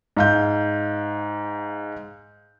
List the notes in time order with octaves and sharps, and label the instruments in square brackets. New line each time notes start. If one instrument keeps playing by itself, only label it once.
[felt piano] G#2 F5 G6